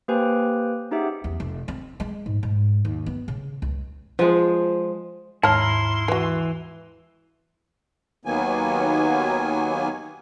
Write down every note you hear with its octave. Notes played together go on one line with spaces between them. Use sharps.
A#3 G4 B4 C5 G5 G#5
C#4 D#4 G4 G#4 E5 F#5
E2
F1
C4
G#3
G#2
G#2
D#2
B3
C#3
C#2
F3 G#3
D#2 G#2 E4 C#5 A5 A#5 C6 F6
E3 F#4 B4
D#2 D#3 F#3 A#3 B3 G#5